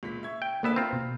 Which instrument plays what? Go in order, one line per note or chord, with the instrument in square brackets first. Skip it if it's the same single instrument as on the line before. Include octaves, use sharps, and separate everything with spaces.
[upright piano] C#2 A#2 B6
E5 C#6 G#6
[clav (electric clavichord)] G5
[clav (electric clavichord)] D2 B3 E5 [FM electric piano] A#3 [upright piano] A4 B4
[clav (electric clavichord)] C4 F4 [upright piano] A#5 B5 F6
[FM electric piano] B2